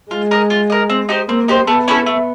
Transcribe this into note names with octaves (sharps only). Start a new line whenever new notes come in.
G#3 F4
A#4 D#5
F4
A#4 D#5
C4
D#4 G4 C5
A#3 C4
D#4 G4 C5
A3 B3
C#4 E4 A4
A3